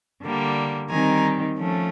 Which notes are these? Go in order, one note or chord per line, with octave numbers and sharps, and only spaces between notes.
D3 G3 A#3
D#3 G3 C4 D#4 G#5 A#5
F3 A3 C#4